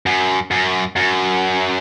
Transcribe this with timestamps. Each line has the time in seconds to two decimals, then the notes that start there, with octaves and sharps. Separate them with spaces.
0.06 F#2
0.51 F#2
0.96 F#2